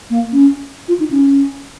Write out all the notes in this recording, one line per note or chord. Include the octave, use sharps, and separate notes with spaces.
A#3
C#4
F4
D#4
C#4